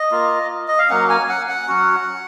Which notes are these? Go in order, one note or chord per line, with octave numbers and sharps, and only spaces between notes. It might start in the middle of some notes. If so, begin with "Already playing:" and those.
Already playing: D#5
A#3 F4
D#5
F5
F#3 A#3 C#4 F#5
G#5
F#5
F#5
F#3 C#4 F#4